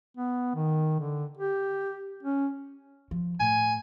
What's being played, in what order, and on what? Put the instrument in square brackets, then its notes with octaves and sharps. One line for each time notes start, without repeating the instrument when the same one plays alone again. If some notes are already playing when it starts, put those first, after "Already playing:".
[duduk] B3
D#3
D3
G4
C#4
[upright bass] F3
[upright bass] A2 [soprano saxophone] G#5